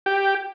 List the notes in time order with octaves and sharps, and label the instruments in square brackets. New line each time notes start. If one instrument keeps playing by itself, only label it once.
[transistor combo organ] G4